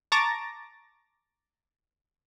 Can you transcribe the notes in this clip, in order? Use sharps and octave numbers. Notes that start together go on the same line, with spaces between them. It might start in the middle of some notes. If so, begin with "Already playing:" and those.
A5 A#5 C#6 D6 A6 A#6